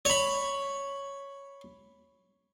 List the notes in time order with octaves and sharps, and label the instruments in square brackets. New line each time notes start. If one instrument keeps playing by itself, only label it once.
[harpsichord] C#5 B5